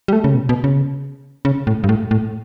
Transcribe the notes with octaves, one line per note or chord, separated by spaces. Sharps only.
G3
A3
C#3
B2
B2
C#3
C#3
A2
G2
A2
A2